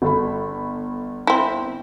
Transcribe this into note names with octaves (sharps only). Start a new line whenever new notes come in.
G1 A4 B5
C4 E4